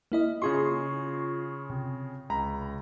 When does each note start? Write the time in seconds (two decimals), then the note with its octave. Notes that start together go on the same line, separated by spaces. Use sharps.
0.12 A#3 E4 D#5
0.42 C#3 F4 G#4 C6 C#6
1.70 C3
2.29 C#2 A#5 B5